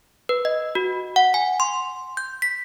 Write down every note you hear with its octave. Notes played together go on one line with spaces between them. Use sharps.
B4
D#5
F#4
F#5
G#5
C6
G6
B6